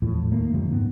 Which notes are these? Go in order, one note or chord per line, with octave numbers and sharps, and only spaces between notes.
E2 A2 F3
D#2 A3 A#3
F#2 D3 F3 G3
G#2 C#3 B3 C4